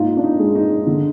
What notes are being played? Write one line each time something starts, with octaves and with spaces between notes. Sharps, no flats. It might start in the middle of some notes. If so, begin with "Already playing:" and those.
Already playing: G#2 A#3 D#4 F4
D4
D#4
G#3
D#4
D3